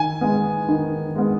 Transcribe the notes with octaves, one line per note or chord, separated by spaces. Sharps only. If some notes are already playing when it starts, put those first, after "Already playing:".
Already playing: D#3 G#5
G#3 B3
D#3
G#3 B3